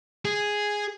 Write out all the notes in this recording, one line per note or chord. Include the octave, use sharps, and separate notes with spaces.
G#4